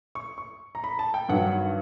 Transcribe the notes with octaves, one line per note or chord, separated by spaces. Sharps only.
C#6
C#6
A#5
B5
A5
G5
G2 D#3 F#3 F#5
F#5